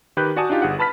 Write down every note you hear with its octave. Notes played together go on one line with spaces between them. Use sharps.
D#3 G4 B4 F#6 G6
F#4 D5 F#5 G#5 A5 D#6
D4 D#4 F4 G4
G1 G#4 F#5
B4 A5 B5 F6 B6